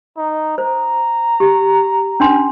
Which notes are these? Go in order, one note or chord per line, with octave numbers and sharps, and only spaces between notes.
D#4
C5 A#5
G4
C#4 D4 C6